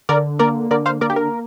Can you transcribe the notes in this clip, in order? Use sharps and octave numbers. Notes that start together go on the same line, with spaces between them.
D3 A#4 D5
A#3 A#4 D5
D3 A#4 D5
C5 F5
A#3 A#4 D5
G4
A#4